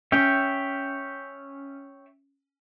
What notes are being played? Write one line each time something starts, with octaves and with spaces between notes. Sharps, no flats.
C#4 C#5 E5 G5